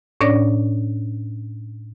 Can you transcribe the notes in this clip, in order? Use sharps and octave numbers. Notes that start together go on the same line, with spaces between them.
A2 C#4 D4 C#5 D5 A#6